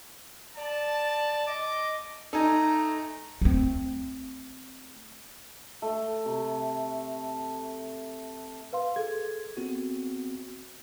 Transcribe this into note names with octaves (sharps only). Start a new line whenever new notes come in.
D5 A5
D#5 D6
A3 D#4 A4 G#5 A#5
A3 C4
A3
C3
B4 F5 C6
G#4 A4 G#6
B3 C4 F#4